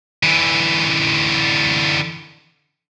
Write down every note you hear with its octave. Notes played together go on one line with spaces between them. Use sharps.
D3 E3